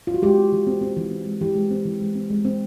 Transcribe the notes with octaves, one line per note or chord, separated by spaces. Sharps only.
F4
F#4
G#3 G4
C4
E3
C4
C4
E3
C4
G#3
E3 G4
G#3
C4
E3
G#3
C4
G#3
C4